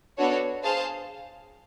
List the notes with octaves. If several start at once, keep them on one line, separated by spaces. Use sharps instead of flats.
B3 D4 F#4 A4 C#5
G#4 C5 F5 A5